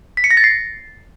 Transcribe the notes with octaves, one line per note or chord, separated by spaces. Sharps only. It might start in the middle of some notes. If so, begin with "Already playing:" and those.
B6
C#7
A#6
A6
C7